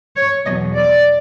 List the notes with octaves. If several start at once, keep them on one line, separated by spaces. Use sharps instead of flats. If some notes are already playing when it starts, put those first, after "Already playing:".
C#5
E2 B2 F#3 D#5
D5